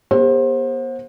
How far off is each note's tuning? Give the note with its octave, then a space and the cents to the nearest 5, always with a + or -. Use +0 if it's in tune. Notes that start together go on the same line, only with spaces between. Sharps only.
B3 -35 G4 +45 C5 +25